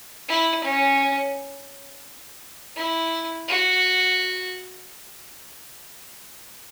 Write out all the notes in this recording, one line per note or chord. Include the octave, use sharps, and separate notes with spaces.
E4
C#4
E4
F#4